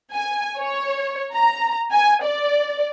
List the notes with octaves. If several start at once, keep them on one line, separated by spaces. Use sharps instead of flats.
G#5
C#5
A#5
G#5
D5